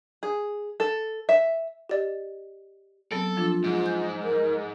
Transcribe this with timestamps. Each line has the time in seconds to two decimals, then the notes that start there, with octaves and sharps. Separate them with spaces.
0.23 G#4
0.80 A4
1.29 E5
1.89 G4 D5 D#5
3.11 F#3 B3 C4 A4
3.37 F3 D4 F4
3.64 G#2
3.86 G6
4.23 A#4